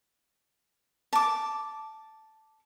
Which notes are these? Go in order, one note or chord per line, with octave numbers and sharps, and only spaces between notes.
A5 D6